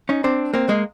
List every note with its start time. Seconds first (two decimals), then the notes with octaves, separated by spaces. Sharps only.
0.09 C#4 D#4
0.24 C4 D4
0.54 A#3 C4
0.69 G#3 A#3